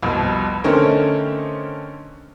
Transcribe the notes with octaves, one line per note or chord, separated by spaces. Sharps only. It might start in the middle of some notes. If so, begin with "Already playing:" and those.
C2 F2 B2
D3 A3 C4 C#4 D#4 A#4